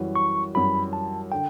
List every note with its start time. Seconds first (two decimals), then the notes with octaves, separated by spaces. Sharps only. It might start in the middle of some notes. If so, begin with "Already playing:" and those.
Already playing: F#2 E3 G3 C#4 F#4
0.16 C#6
0.54 F#2 E3 G3 C#4 F#4 B5
0.93 A5
1.32 D3 G5